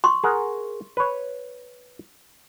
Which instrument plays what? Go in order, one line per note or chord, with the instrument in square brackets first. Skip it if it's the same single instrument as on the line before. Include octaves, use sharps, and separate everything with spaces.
[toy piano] C6 C#6
[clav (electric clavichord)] G#4 A#4 F#5
B4 C#5